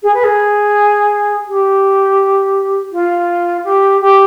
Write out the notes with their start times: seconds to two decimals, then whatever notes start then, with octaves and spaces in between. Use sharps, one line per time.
0.03 G#4
0.14 B4
0.24 G#4
1.48 G4
2.92 F4
3.64 G4
4.01 G4